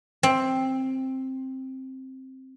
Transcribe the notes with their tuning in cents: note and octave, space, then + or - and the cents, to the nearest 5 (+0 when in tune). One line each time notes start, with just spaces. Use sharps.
C4 +10